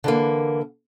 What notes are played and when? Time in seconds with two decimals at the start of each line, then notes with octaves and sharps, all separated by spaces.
0.04 D3 E3 A#3